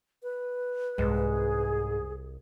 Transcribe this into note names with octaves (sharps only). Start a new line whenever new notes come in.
B4
C2 G#2 G#4